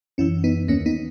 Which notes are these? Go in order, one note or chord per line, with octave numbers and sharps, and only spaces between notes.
F#2 E3 C#4 E4
B3 D#4
D#2 D#3 A#3 C#4
B3 D#4